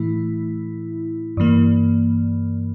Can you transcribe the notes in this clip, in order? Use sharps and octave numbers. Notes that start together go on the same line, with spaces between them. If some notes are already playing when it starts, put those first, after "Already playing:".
Already playing: A2 E3 A3 E4
G2 E3 A#3